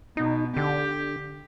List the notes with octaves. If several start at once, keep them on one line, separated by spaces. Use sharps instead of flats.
B2 D#4
D3 G4